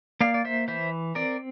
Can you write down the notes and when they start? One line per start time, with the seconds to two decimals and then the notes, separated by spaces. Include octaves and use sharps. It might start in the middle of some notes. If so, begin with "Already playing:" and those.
0.21 A#3 D5 F5
0.34 D5
0.45 C5 E5
0.68 E3 C5 E5
1.15 C4 A#4 D5